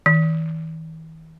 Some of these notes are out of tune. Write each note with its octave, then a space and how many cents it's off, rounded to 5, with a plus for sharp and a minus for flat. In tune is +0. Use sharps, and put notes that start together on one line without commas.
E3 -45